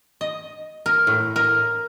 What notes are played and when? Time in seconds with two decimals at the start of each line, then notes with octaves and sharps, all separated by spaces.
0.21 D#5
0.86 A#4
1.07 A2
1.36 A#4